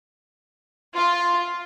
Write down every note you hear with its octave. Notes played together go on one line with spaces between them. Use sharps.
F4